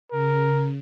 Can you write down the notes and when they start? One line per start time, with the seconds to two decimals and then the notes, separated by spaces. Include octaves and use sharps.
0.11 C#3 A#4